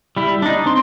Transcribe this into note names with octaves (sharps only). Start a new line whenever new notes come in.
G3 E4
D4 D#4
C4 C6